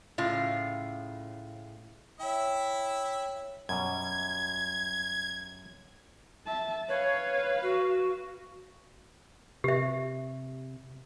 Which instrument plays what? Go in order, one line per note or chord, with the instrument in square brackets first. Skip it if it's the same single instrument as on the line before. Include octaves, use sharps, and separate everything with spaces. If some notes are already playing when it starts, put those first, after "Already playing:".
[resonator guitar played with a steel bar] A2 C#3 F4
[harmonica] E4 E5 [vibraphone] C#5 G5
[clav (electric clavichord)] F#2 B2 G3 [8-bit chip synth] G#6
[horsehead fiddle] E5 A5
[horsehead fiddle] B4 F5 [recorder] C#5
[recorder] F#4
[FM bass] C3 [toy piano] G4 E5